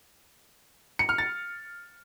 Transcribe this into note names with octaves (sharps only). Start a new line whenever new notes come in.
C#7
F6
A6